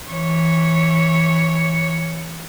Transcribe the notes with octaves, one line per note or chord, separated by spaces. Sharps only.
E3 C#5